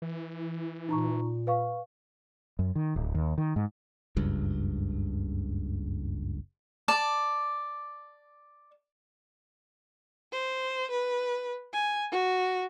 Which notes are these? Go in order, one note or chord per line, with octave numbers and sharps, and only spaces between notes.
E3
A#2 D#4 A#5 C#6
B4 F5 C#6
F#2
D#3
D1
D#2
D#3
G#2
F#1 C#2 G2
D5 A5 D6
C5
B4
G#5
F#4